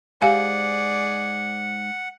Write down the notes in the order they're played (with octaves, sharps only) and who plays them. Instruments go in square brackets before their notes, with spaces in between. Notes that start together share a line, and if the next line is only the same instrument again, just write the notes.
[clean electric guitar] G#2 [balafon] G4 F5 G#5 [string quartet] G#4 D5 [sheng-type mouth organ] F#5